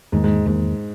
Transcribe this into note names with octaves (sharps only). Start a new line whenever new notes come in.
E2 G#2 D#3 A#3
G#2
E2 G#2 D#3 A#3